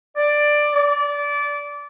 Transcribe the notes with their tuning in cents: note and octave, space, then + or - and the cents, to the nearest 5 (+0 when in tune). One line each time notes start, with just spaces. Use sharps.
D5 +10
D5 -20